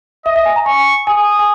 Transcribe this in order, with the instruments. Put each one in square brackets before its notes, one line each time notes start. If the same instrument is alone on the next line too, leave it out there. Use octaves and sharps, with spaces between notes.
[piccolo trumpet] D#5 [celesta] E5
[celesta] E5
G#5
A#5
[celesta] G#5 [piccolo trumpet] C#6
[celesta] G#5 [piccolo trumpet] D#6
[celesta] G#5